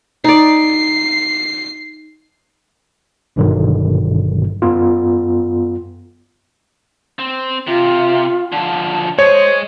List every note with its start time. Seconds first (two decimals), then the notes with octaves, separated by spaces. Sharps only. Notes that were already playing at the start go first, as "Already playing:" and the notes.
0.24 D#4 D5 C7
3.36 G#1 G2 B2 D3 D#3 F#3
4.62 F#2 B3 F4
7.19 C4
7.67 C3 F4
8.52 D3 F3 A5
9.19 G#3 C5 C#5 D#5